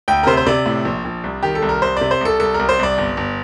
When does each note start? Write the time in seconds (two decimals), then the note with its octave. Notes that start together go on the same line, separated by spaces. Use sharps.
0.08 D2 G5
0.23 A#4
0.27 C3 C5
0.37 C5
0.46 C3 D5
0.66 A2
0.85 A#1
1.05 A#1
1.24 C2
1.43 D#3 G4
1.55 A4
1.62 C2
1.69 A#4
1.82 C2 C5
1.97 C3 D5
2.11 C5
2.21 C2 A4
2.40 C2 A4
2.54 C2 A#4
2.69 C5
2.79 C2 D5
2.98 G1
3.17 G1